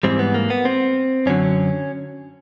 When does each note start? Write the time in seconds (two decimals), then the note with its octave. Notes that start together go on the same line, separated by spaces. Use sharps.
0.03 G#2 E3 G3 C4
0.19 B3
0.34 A#3
0.50 B3
0.65 C4
1.26 F#2 D3 F#3 C#4